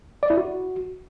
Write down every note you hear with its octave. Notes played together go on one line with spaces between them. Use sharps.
D5
E4
F#4